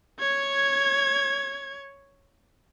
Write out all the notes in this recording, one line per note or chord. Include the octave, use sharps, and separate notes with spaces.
C#5 G#6